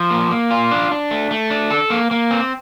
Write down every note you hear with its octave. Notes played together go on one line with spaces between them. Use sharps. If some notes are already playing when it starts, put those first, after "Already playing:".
Already playing: F3
A#3
A#3
F4
D4
D4
A3
A3
D4
A4
A#3
A#3
C4